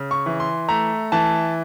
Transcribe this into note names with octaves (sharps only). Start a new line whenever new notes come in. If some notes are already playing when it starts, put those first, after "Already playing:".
Already playing: C#3
C#6
E3
C6
A3 A#5
E3 A5